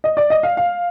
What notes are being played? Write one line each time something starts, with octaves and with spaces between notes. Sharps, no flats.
D#5
D5
D#5
F5
F5